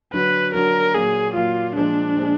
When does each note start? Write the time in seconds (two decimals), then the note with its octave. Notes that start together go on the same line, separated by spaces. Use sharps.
0.13 D3 F#3 D4 F#4 B4
0.54 D3 F#3 D4 F#4 A#4
0.94 A#2 F#3 A#3 G#4
1.35 A#2 F#3 A#3 F4
1.76 A#2 F3 G#3 D4
2.16 A#2 F3 G#3